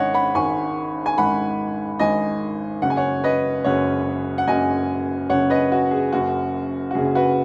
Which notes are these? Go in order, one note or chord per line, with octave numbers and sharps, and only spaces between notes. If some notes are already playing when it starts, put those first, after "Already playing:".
Already playing: G#1 G#2 D#3 C#5 D#5 F#5 G#5
F#5 B5
G#1 G#2 D#3 G#5 C#6
G#5
G#1 G#2 D#3 F#5 B5
G#1 G#2 D#3 D#5 G#5
F#1 F#2 C#3 F#5
G#5
C#5 F#5
B4 D#5
F#1 F#2 C#3 C#5 F#5
F#5
F#1 F#2 C#3 D#5 G#5
F#1 F#2 C#3 C#5 F#5
B4 D#5
F#4
G#4
F#1 F#2 C#3 F#4
F#4
F#1 F#2 C#3 G#4
F#4 B4